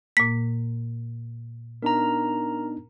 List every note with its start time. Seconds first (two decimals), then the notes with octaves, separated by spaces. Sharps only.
0.17 A#2 A#3 B6
1.82 B3 D4 D#4 A#4 A#5